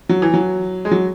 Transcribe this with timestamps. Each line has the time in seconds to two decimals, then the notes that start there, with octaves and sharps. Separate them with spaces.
0.09 F#3
0.22 E3
0.34 F#3
0.85 G#3
0.91 F#3